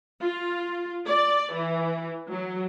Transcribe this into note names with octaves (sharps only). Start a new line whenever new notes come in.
F4
D5
E3
F#3